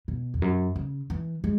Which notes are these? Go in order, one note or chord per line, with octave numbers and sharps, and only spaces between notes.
B2
E2
F#2
C#3
E3
G#3